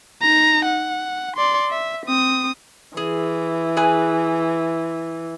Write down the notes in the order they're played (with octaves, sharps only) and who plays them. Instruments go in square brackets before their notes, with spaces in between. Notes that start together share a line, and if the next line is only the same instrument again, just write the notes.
[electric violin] D#4 A#5
F#5
D5 C6
E5
C4 D#6
[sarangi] E3 [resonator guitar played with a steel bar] G#4
[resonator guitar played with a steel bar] G#4 B4 G#5